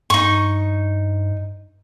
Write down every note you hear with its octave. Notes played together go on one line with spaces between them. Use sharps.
G2 D#4 C#6